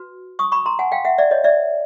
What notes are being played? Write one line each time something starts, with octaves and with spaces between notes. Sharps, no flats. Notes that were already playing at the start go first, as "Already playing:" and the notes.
Already playing: F#4 B4
C#6 D#6
B5 C#6
A#5 C6
F#5 G#5
F5 G5
E5 F#5
D5 E5
C#5 D#5
D5 E5